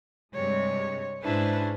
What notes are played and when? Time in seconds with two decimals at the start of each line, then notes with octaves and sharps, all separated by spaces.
0.35 G2 C3 G#3 C#5
1.23 G#2 C#4 D4 E4 G#4 B4 C5